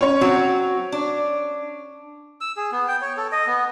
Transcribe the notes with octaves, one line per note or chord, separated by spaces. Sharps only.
C#4 C#5
F#3 C4 F#4
D4
E6
G#4
B3
G5
C#5
A4
D#5
B3